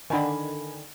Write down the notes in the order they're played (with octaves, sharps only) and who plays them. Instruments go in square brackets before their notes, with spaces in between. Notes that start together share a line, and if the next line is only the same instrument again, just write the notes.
[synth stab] D3 D#3 [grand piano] G#5 B5